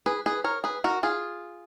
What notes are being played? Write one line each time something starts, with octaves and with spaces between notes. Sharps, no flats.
G#4 B4
G#4 B4
A#4 C#5
G#4 B4
F#4 A#4
F4 G#4